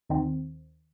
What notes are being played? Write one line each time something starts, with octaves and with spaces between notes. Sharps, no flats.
D#2 D#3 C4